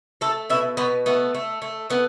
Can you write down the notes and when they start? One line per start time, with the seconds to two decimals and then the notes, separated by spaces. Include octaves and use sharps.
0.21 A3 A4
0.50 B2 E4
0.77 B2 B3
1.06 A3 B3
1.34 A3
1.62 A3
1.90 A3 B3